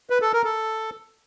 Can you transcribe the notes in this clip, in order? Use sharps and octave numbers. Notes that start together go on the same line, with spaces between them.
B4
A4
A#4
A4